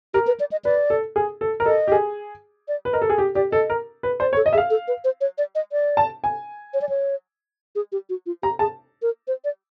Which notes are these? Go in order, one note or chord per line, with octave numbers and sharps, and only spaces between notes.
G4 A#4
B4
D5
D#5
B4 D5
A4
G#4
A4
A#4
A4 D#5
G4
G#4
D5
B4
A#4 D#5
A4
G#4
G4
G4 D5
A4 D#5
A#4
B4
C5 D5
C#5
A4
D#5
G#4 E5
F5
A4
B4
C5
C#5
D5
D#5
D5
A5
G#5
C#5
D5
C#5
G#4
G4
F#4
F4
G4 A#5
G#4 A5
A#4
C5
D5